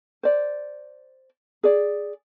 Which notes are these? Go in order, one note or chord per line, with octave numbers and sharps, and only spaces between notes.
C5 D5
G#4 D5